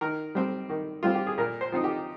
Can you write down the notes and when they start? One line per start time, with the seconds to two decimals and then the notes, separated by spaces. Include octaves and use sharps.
0.01 D#3 A#4
0.35 G3 C4
0.69 D#3
1.03 G3 C4 F4
1.14 G4
1.27 G#4
1.38 A#2 A#4
1.61 C5
1.72 F3 C4 D#4
1.84 G4